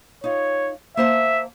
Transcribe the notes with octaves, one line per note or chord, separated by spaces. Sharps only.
D#4 F4 C#5
A#3 C5 E5 A5